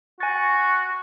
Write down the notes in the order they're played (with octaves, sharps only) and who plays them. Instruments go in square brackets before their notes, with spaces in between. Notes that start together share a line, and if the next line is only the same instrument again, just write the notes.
[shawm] F#4 [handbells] G#5 A6 [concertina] C#6